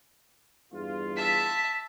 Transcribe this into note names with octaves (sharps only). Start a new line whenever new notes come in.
E2 G2 F4
E5 A5 B6